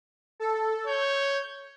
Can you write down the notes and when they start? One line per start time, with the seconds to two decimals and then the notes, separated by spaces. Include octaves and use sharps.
0.40 A4
0.87 C#5 G6